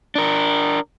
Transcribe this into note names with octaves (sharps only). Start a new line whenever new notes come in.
D4 A#4